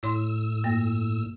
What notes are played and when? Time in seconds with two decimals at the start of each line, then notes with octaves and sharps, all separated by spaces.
0.03 A2 E4 C#5 C6 E6
0.64 G2 A#3 A#6